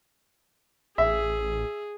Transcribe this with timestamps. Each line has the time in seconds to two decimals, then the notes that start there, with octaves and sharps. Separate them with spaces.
0.98 A1 G#4 E5